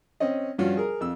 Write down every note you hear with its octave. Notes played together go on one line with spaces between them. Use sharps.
C4 C#4 D#5
G2 F3 C#4 F4 F#4
G#4 A#4
F2 E6